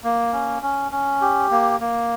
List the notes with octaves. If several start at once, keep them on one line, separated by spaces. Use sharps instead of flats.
A#3
C#4
C#4
C#4
G4
A#3
A#3